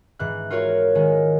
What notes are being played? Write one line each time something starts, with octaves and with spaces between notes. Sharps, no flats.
G#2 E3 F#6
F4 F#4 A#4 C#5 F5
D#3 G#3